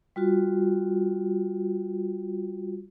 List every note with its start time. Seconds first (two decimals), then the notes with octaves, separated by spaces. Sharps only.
0.16 G3 F4 F#4